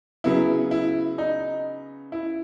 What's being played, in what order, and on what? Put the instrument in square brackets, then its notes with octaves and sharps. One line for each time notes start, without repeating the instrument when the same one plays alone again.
[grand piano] C#3 F#3 B3 E4
E4
D#4
E4